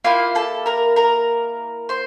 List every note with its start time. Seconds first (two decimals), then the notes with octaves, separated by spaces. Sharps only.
0.04 A#3 E4 F4 G4 F5
0.35 A4 A5
0.66 A#4 A#5
0.96 A#4 A#5
1.89 C5 C6